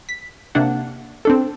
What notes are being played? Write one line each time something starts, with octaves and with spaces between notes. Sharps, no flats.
B6
C3 A#3 D4 F#5
C4 D4 A4